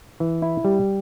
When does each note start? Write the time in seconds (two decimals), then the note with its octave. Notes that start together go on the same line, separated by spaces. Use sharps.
0.20 E3
0.42 E4
0.65 G3